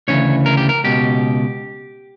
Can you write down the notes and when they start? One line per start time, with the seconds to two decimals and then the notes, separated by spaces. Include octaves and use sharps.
0.08 D2 C#3 E3 C#5
0.46 A#4
0.57 G4
0.69 A#4
0.84 C#2 B2 G4